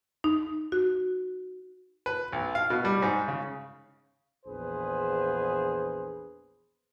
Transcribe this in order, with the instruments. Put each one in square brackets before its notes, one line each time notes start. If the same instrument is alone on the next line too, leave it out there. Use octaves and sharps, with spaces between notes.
[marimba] D#4
F#4
[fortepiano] B4
B1
F5
B2
G3
G#2
C#3
[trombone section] A#1 E2 G#4 B4 C5